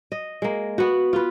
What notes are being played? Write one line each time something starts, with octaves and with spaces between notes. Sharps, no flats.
D#5
G#3 A#3
B3 F#4
F4 B4